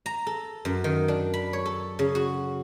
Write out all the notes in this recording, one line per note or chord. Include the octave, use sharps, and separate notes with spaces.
A#5
A4
F#2
D#3
D4
B5
C#5
A4
C#3
F#4